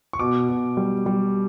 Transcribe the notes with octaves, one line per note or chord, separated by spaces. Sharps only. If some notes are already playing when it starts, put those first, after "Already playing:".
C#6
B2 D6
B2
G3
G3